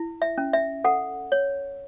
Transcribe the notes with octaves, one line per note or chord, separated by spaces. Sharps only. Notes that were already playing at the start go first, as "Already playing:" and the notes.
Already playing: E4
E5
C#4
E5
A4 F#5
C#5